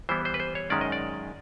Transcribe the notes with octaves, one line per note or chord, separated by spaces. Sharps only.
E3 G3 B3 E4 C5
C5
B4
C5
C#5
F#2 D#3 G#3 C#4 D5
D#5
D5